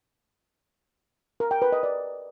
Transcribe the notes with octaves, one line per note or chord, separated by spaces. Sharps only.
A#4
G5
B4
D#5
D5